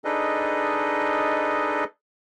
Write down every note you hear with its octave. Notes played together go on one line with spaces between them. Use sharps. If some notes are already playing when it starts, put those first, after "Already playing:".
D4 D#4 G#4 A4 B4 D#5